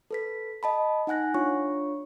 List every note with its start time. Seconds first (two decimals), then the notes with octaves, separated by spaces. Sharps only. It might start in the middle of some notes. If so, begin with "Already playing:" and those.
0.11 A4 B4 B6
0.63 D#5 A5 B5
1.07 D#4 F#5 G#5 F#6 A#6
1.34 D4 F4 C#5 C#6